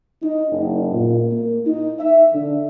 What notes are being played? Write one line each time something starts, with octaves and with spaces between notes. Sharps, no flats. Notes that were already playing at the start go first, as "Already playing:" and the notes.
D#4
F#1
A#2
A#3
D#4
E5
D3